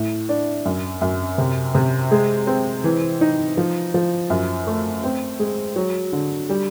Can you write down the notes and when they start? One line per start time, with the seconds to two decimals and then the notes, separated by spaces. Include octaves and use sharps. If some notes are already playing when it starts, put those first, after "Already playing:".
Already playing: A2
0.29 D4
0.65 F#2
1.01 F#2
1.38 C3
1.75 C3
2.11 G#3
2.47 C4
2.84 E3
3.21 D#4
3.57 F3
3.94 F3
4.30 F#2
4.67 A3
5.04 C4
5.39 G#3
5.76 F#3
6.12 D3
6.49 G3